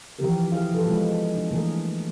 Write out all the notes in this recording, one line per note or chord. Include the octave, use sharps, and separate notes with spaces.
E3 F3 C4 G4 A#4
E4 G#4 F5
F3 A4 B4
G#3 B3 C4 F4
D4
E3 A3 A#3 G#4 A#4